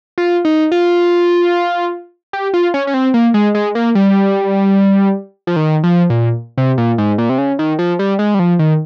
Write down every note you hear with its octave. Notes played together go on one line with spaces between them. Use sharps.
F4
D#4
F4
G4
F4
C#4
C#4
C4
A#3
G#3
G#3
A#3
G3
F3
D#3
F3
A#2
C3
A#2
G#2
A#2
C3
C#3
D#3
F3
G3
G#3
G3
F3
D#3